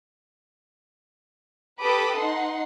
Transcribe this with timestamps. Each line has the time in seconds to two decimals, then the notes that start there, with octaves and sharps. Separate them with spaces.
1.82 G4 A4 B4 B5 D6 D#6
2.18 D#4 F#5 C6